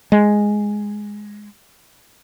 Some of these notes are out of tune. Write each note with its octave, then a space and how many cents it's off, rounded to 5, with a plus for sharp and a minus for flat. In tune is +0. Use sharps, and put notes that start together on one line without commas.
G#3 +0